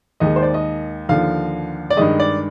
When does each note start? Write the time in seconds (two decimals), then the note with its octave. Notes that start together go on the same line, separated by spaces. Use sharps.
0.20 D#2 D#3 G#3 D#5
0.36 C5
0.42 D5
0.54 D#5
1.09 D#2 D3 F3 F5
1.90 D5
1.97 G2 D#3 G#3 D#5
2.20 D5